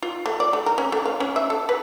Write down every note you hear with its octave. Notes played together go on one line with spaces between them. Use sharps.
F4
A3
D5
A3
A#4
C#4
A3
F5
C#4
E5
A4
B4